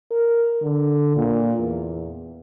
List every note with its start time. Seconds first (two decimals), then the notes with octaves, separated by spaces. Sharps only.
0.11 A#4
0.62 D3
1.16 A#2
1.59 E2